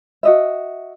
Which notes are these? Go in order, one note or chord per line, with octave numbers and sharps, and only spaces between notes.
F#4 D#5 E5